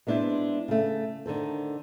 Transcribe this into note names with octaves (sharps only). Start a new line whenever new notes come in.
G#3 B3 D4 E4 C5
C#3 A3
D3 D#3 A4 C5